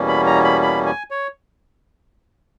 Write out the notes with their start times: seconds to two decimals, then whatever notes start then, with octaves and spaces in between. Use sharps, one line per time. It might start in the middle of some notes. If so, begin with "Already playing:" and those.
Already playing: E2 B2 G3 A#3 C#4
0.09 B5
0.26 A#5
0.44 B5
0.62 B5
0.86 G#5
1.11 C#5